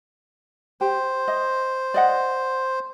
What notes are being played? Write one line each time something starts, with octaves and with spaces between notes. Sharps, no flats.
G4 C5
D#5
D5 D#5 F#5